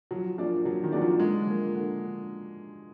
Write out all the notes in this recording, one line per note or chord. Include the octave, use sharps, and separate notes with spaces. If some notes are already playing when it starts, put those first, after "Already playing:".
F3 F#3
F3 A#3 D4 G#4 D5
F3 F#3
D#3
F#3 A#3 D4 G#4 D5
F3
D3 G#3
F3 A#3
D3